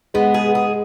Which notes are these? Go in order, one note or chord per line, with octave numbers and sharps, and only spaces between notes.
G#3 B3
G#4
G#4